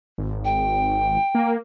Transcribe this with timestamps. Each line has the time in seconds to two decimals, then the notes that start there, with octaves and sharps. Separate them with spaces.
0.18 G#1
0.44 G5
1.35 A#3